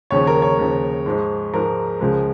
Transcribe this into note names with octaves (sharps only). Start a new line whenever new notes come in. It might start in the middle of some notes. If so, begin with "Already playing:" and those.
D#2 C#3 F3 C#5
A#4
C#5
D#2 C#3 F3
G#2 F3 G#3
G#2 F3 G#3 A#4
C#2 C#3 F3 G#3